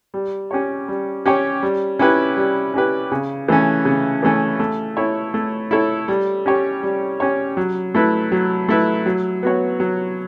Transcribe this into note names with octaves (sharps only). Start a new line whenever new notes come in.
G3
C#4 G4 C#5
G3
C#4 G4 C#5
G3
C#4 E4 G4 B4
G3
C#4 E4 G4 B4
C#3
E3 A3 C#4
C#3
E3 A3 C#4
A3
E4 A4 C#5
A3
E4 A4 C#5
G3
C#4 G4 C#5
G3
C#4 G4 C#5
F#3
A3 E4 B4
F#3
A3 E4 B4
F#3
B3 F#4 C#5
F#3